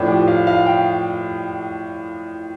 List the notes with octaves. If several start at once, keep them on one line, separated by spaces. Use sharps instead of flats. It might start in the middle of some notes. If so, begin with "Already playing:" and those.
Already playing: A2 F3 D4
G4
F5
F5
G5